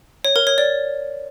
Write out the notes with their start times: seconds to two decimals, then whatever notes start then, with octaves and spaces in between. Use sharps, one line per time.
0.25 C#5
0.36 A#4
0.47 C#5
0.58 D5